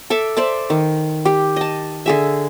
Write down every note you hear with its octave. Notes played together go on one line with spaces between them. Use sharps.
A4 E5 D6
C5 D5 E5 A5
D#3
G4
D#5 A5
D3 G#4 E5